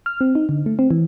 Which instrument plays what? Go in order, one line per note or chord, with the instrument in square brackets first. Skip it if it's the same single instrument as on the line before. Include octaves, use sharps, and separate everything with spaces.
[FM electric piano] F6
C4
D#4
D3
A3
C4
E3